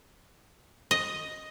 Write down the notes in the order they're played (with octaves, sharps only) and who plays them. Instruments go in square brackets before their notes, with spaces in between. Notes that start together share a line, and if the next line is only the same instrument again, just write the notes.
[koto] D#5